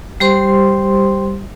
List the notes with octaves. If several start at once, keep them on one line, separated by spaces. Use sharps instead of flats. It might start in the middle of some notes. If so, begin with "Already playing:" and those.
G3 G4 C5 C6